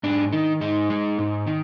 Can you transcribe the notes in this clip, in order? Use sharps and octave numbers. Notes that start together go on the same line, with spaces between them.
G#2 D4
D#3 D#4
G#2 D#4
G#3
G#2
D#3